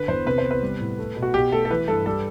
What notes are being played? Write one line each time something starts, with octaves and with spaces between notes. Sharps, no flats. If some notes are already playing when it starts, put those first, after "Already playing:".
Already playing: D3 B4
E2 C5
C3 B4
C5
B3
B4
G3
A2
A3
B2
F#4
B2 G4
A3 A4
A4
E3 B4
G2 A4
G3 A4